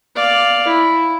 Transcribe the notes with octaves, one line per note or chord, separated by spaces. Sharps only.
D5 F5
E4